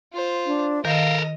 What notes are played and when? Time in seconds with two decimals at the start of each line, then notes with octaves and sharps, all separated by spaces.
0.13 F4 C5
0.46 D4
0.85 D#3 A4 A#4 D#5 F5